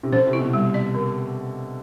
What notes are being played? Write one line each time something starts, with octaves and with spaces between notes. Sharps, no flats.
C3
D3 C5
C3
E4
B2
G3
D5
D3